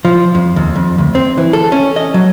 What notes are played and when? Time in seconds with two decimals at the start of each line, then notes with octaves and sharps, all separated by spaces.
0.05 F3
0.35 F2
0.56 D#2
0.76 F2
0.98 D2
1.15 C4
1.38 E3
1.53 A4
1.72 C#4
1.96 D#5
2.14 F#3